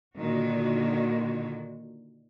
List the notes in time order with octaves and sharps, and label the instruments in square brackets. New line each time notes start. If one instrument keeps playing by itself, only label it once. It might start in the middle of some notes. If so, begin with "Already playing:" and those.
[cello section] A#2 D3 D#3 F#4